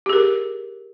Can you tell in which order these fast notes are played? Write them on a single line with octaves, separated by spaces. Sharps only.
G4 G#4 A#4